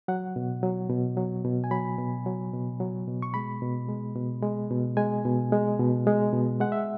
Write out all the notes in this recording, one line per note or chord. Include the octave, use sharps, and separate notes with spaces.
F#3 F#5
B2
F#3
B2
F#3
B2
G#5
F#3 B5
B2
F#3
B2
F#3
B2
C#6
G#3 B5
B2
G#3
B2
G#3
B2
G#3 G#5
B2
G#3
B2
G#3
B2
G#3 F#5
E5